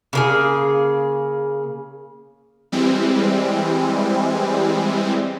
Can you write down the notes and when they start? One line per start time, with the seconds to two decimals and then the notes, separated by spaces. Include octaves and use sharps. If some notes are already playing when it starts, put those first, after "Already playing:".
0.13 C#3 A#3 G#4
2.72 E3 G3 G#3 C4